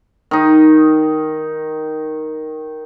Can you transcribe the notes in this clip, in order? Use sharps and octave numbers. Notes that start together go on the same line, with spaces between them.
D#3 D#4